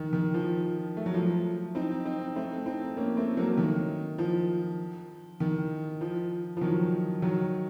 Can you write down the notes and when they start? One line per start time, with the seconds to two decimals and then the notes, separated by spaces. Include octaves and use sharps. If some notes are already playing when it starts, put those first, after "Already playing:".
Already playing: D#3
0.13 D#3
0.34 F3
0.97 A3
1.06 F#3
1.14 F3
1.75 C4 D#4
2.05 C4 D#4
2.36 A3 C4
2.66 C4 D#4
2.97 A#3 C#4
3.17 A3 C4
3.37 F#3 A#3
3.58 D#3
4.18 F3
5.40 D#3
6.01 F3
6.57 F3
6.61 D#3 F#3
7.22 D#3 F#3